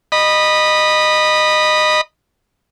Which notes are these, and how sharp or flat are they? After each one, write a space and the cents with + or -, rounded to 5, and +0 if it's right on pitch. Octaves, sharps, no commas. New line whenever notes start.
D#5 -20 B5 -10